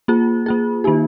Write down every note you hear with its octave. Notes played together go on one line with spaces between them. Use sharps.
A#3 F4 G#4
A#3 F4 G#4
D#3 A#3 D#4 G4